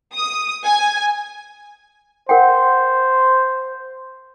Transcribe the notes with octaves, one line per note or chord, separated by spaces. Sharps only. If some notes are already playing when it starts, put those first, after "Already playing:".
D#6
G#5
A#4 C5 F#5 G5